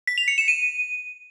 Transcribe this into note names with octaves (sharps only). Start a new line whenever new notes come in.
B6
F7
C#7
E7
D#7